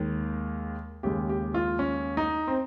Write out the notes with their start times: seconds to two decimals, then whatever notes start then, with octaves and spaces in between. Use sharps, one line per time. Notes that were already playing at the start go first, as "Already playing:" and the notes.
Already playing: D#2 D#3 G#3
1.03 D#2 C#3 G#3 G4
1.29 G4
1.54 F4
1.79 C#4
2.17 D#4
2.47 C4